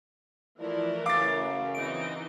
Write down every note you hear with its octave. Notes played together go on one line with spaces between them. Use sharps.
E3 F3 A3 E4 A#4 D5
F#2 C#3 F5 D6 A6
E3 C4 D#4 D7